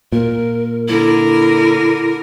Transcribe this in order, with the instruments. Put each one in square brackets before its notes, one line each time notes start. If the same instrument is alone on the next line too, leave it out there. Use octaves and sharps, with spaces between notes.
[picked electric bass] A#2 [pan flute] A#4
[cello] D3 A#4 [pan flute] E4